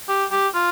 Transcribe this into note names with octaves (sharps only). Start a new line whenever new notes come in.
G4
G4
F4